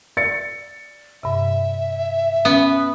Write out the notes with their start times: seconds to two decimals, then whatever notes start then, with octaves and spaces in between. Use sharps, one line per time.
0.17 D5 A6 C#7
1.23 G2 C3 E5
2.45 B3 C#4